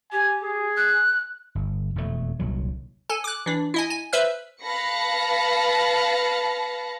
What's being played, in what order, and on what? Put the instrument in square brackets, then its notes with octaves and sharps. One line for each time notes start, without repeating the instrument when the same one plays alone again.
[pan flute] G4 [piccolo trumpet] G#5
[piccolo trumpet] G#4
[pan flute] F#6
[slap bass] G1
E1 F2 B2 A3
D#1 C2 D#3 F#3
[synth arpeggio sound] A4 G#5
D6 F#6
E3 D4
E4 D#5 G#5
G#5
B4 C5 E5 E6 F6
[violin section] B4 F5 A5 B5 A#6 C#7